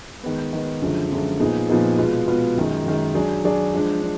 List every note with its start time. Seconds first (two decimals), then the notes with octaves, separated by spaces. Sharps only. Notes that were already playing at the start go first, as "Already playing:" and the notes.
0.24 D#3 G#3 B3
0.53 D#3 G#3 B3
0.82 F#2 D3 F3 G#3
1.11 F#2 D3 F3 G#3
1.40 A#2 F3 B3 D#4 G#4
1.69 A#2 F3 B3 D#4 G#4
1.98 B2 G#3 B3 F4
2.28 B2 G#3 B3 F4
2.57 F#2 D#3 G#3
2.86 F#2 D#3 G#3
3.15 F#3 D4 G#4 D5
3.44 F#3 D4 G#4 D5
3.73 F3 G#3 D4
4.02 D4